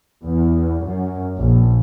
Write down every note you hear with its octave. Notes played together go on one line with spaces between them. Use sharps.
E2
F#2
A#1